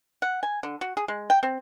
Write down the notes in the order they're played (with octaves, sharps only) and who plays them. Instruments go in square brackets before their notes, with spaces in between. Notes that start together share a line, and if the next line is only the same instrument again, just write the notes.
[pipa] F#5
G#5
D3
F#4
G#4
G#3
G5
C4